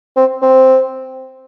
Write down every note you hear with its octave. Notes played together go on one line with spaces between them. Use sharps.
C4
C4